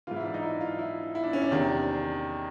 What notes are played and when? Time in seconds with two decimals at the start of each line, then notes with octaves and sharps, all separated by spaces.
0.07 G#2 E3 F4
0.16 E4
0.25 D4
0.34 D#4
0.43 E4
0.61 F4
0.79 E4
1.15 E4
1.24 D4
1.33 C#4
1.42 D4
1.51 E2 C3 D#3